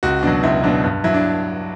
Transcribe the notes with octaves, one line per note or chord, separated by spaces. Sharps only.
C#2 F#4
B2 F#3 D4
C#2 E4
B2 F#3 D4
G2
F#3 E4
D4